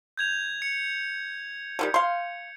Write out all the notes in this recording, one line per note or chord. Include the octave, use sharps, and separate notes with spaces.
G6 G#6 F7
C#7
D3 D#3 G3
F5 C6